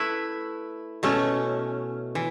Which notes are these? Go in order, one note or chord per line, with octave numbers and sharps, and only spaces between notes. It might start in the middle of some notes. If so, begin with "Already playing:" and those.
Already playing: A3 E4 B4 E5
B2 A3 C#4
E3